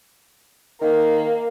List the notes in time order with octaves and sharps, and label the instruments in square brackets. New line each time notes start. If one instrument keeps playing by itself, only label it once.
[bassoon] D#3 [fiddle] A#3